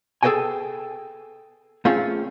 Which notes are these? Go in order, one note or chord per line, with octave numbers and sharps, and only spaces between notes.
G#4 A4 C5 D#5 G5 G#5
A3 C4 C#4 F4 G#4